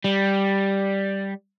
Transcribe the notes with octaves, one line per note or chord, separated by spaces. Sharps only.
G3